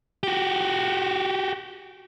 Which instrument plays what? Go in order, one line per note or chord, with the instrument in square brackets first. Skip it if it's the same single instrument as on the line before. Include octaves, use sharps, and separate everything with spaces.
[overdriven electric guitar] F#4 G4